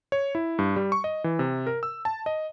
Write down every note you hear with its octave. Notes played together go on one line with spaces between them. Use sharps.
C#5
E4
G2
G3
C#6
D#5
E3
C3
A#4
E6
A5
D#5